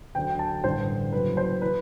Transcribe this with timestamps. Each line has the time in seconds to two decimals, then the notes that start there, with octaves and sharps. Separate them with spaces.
0.15 D2 D3 F#3 G5
0.39 A5
0.64 A1 G2 D3 C5
1.13 F#1 F#2 F#3 B4
1.37 C5
1.62 E3 B4